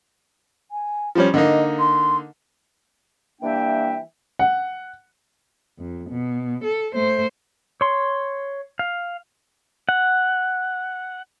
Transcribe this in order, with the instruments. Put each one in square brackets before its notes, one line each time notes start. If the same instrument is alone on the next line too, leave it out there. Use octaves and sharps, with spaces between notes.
[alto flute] G#5
[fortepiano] F3 G3 C#4
[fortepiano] D3 A#3 D#4 [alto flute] D#5
[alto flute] C6
[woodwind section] E3 G3 A#3 D4 E5 G5
[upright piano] F#5
[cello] F2
B2
A4
A3 C5
[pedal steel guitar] C#5 C6
F5
F#5